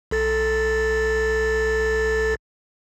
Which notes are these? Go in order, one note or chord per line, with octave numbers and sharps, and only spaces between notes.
B1 A4 A6